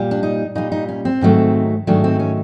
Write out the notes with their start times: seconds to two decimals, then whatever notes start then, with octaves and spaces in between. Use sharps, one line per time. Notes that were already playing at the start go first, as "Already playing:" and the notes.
Already playing: A#2 G3
0.11 D4
0.23 D#4
0.55 A#2 G3 D#4
0.72 D#4
0.89 C#4
1.05 C4
1.21 G#2 D#3 F#3 A3
1.87 G#2 D#3 F#3 A3 D4
2.04 C4
2.19 C#4